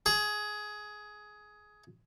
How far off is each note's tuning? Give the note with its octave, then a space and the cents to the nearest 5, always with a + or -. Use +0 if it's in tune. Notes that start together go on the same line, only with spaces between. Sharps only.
G#4 +15